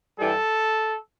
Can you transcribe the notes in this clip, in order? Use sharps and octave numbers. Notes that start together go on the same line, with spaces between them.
G2 E3 G3 A4